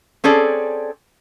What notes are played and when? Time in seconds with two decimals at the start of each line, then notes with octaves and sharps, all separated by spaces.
0.24 C4 C#4 G#4 A4 D5